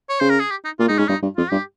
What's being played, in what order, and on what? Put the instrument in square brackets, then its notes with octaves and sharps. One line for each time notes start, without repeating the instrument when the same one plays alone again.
[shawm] C#5
[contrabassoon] C#3 [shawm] C5
[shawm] A#4
G#4
G4
D#4
[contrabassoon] A#2 [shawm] F4
[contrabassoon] G#2 [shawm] D#4
[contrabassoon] G#2 [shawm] C#4
[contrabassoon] G2 [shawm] D#4
[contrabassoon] G2
[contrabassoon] F2 [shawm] F4
[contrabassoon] G2 [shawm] G4